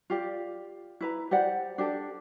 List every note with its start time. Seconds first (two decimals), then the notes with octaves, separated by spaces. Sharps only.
0.10 F4 G4 D5
1.01 E4 B4 A#5
1.31 G4 C5 D5 F#5
1.78 D4 G4 A4